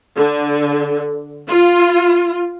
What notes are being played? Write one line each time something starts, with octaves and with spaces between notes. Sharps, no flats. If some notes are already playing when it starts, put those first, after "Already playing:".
D3
F4